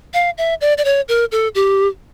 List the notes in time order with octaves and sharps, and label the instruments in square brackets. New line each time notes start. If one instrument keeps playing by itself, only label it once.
[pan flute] F5
E5
D5
D5
C#5
A#4
A4
G4